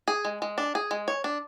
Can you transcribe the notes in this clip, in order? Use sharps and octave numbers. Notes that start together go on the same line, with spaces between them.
G#4
G#3
G#3
D4
G#4
G#3
C#5
D4